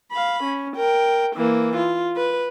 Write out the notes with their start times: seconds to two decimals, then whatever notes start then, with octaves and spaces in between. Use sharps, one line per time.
0.12 F5 B5
0.43 C#4
0.76 A#4 G5
1.36 E3 A#3
1.76 F4
2.17 B4